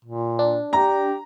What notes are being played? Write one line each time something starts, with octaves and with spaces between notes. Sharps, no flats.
A#2
D4
G4 A#5